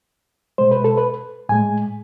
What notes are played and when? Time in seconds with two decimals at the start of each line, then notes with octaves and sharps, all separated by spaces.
0.58 B2 G#3 C5
0.71 B4
0.84 A4
0.97 B4
1.49 A2 G#3 G#5